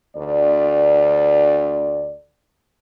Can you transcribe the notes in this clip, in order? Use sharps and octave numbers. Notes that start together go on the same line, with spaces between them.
D2 D5